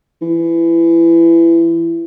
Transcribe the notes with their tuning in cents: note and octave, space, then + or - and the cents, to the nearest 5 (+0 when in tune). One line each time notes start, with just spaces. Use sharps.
E3 +20